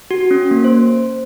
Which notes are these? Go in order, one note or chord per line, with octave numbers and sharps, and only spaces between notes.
F#4
C#4
A#3
C5